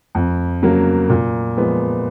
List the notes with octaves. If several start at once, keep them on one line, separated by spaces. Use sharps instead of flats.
F2
C#3 F#3 A#3
A#2
F3 G#3 B3